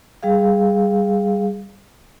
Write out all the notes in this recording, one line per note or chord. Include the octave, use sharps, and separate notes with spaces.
G3 G#4 F5